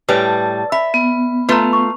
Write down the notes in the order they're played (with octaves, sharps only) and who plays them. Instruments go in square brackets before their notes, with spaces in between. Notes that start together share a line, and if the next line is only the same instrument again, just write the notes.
[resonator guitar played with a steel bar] A2 G3 [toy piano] B4 C#5 G#5 [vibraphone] A5
[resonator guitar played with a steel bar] E5 [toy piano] B5
[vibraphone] B3
[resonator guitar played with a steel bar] A3 F4 [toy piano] B4 A#5
[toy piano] C#6